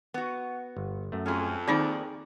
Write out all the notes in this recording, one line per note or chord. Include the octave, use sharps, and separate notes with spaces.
B3 F#4
G1
F#2 A3
F2 C#4 G#4
D#3 A#3 C4 D#4 G#4 C5 D5 G5